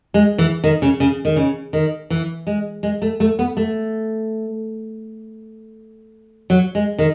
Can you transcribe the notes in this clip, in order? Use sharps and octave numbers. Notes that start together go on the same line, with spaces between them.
G#3
E3
D#3
C#3
C#3
D#3
C#3
D#3
E3
G#3
G#3
A3
A3
B3
A3
F#3
G#3
D#3